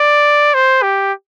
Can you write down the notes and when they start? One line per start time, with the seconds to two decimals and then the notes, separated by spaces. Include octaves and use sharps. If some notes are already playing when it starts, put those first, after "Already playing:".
Already playing: D5
0.54 C5
0.82 G4